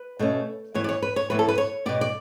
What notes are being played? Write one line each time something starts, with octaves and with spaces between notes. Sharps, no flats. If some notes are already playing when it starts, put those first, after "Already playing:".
Already playing: B4
B2 A3 C#4
A2 E3 B3 C#5
D5
C#5
B4
C#5
A2 E3 B3 B4
A4
B4
C#5
B2 G3 B3 D5
D5